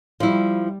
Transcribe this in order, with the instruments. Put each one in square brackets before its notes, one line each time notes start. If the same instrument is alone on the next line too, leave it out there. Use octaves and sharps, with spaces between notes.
[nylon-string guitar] F3 E4 [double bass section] G3